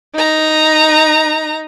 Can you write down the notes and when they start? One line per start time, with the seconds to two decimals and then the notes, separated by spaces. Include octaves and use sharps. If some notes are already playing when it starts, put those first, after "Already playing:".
0.15 D#4 A#5